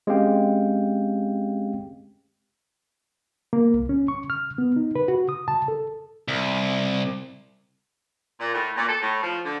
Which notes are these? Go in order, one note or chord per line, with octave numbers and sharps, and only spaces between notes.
G#3 C4 C#4 G4 F5 G5
A#3
C2
C#4
C#6
F6
B3
D#4
B4
F#4
D#6
A5
A4
C2
A#2
A2
A#2
A4
A2
F3
D3